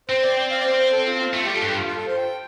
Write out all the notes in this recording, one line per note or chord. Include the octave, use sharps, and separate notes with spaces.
C4 C5
D5
G5
F5
D5
C5
C5
A4
F4
F4
A3 F4
G3 G4
A4
G2 G4
F4
F4
A4
C5
G5